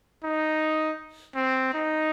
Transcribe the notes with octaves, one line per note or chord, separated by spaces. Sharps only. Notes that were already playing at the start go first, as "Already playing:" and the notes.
D#4
C4
D#4